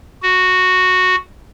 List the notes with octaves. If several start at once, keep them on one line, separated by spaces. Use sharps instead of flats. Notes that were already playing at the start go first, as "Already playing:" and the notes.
F#4